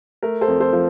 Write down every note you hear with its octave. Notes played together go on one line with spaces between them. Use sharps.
A3 A#4
A4 C5
F2
A4 C5
F3